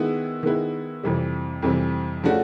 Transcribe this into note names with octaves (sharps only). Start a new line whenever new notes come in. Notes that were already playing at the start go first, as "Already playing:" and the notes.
Already playing: D#3 G#3 B3 E4
D#3 G#3 B3 E4
F2 C3 E3 G3
F2 C3 E3 G3
C#3 F3 A3 D4 F#4